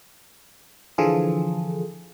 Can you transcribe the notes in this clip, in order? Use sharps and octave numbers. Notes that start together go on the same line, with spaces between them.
D3 E3 F3 F4 G#4 A4